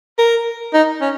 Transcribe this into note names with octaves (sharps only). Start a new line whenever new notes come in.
A#4
D#4
C#4